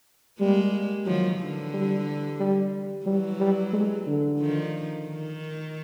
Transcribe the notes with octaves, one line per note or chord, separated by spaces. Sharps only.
G3 G#3 A#3
D#3 F3 F#3
D3 E3
G3
G3
E3 F#3 G3
G3
G#3
D3
D#3 F3
D#3